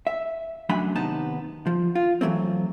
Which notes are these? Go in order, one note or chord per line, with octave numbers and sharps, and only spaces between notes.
E5
F#2 F#3 A3 D4 G#5 B5
D#2 C3 B3 D#4 A5 A#5
F3
F4
E3 F#3 A3 C4